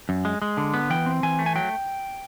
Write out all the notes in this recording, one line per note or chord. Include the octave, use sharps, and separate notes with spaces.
F#2
G#3
G#3
D3
B3
E3 G5
C4
E3 G#5
A3
G#5
F#3 G5